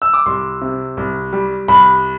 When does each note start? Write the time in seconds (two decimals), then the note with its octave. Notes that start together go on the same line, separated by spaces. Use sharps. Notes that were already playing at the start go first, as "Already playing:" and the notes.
0.02 E6
0.14 D6
0.26 C2 C6
0.61 C3
0.97 C2
1.33 G3
1.68 C2 B5